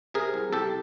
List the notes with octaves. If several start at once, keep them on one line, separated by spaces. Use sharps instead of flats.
C3 G#4 A#4
C2
C2 G4 A4